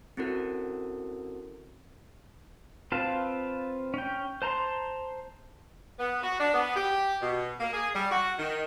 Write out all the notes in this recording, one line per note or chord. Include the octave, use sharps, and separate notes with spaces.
C4 C#4 E4 F#4 A4 A#4
C4 F4 B4 F5 A5
C#4 G5
C5 A5 A#5 C6
B3
F#4
D4
B3
G4
B2
A#3
G#4
G3
F#4
D#3